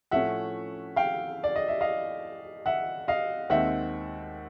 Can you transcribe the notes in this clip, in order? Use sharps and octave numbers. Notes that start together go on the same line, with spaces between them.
A2 F3 A3 C#4 E5 F#5
F5 G5
D5
D#5
E5
D#5 F5
E5 F#5
D#5 F5
D#2 D#3 G#3 C4 E5 F#5